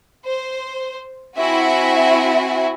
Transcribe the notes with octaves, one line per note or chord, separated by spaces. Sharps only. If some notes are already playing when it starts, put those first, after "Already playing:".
C5
C4 E4 F#4 E5 G#5